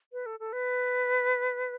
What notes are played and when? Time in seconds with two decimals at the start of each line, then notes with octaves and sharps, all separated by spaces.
0.13 B4
0.26 A4
0.40 A4
0.53 B4